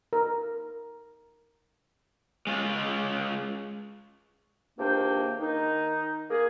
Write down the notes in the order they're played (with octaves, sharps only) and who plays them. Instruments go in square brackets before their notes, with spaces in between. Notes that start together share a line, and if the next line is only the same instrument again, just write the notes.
[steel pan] A#4
[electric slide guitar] G#3 C#4 F4
[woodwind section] C#2 C3 D#3 A#3 D4 G5
D#3 D#4
A#3 G#4